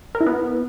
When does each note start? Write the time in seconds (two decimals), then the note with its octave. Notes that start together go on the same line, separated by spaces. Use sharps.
0.15 A#4
0.21 E4
0.26 B3